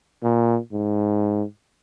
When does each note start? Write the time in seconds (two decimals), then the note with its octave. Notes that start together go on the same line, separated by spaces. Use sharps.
0.23 A#2
0.73 G#2